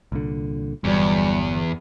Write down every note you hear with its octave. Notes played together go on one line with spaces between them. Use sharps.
C2 A#2 D3
G1 E2 F#3 G3